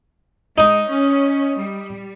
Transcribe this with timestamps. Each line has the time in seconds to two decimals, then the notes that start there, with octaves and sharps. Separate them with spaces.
0.58 G#3 D#4
0.90 C#4
1.58 G3